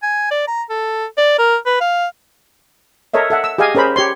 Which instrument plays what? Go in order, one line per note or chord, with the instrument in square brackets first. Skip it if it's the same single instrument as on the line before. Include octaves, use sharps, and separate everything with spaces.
[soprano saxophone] G#5
D5
A#5
A4
D5
A#4
B4
F5
[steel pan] A4 A#4 C#5 D#5 E5
A4 E5 F#5
E6
G4 G#4 D#5 F5 G#5
C#4 G#4 A#4 C5 B5
G4 C#5 C6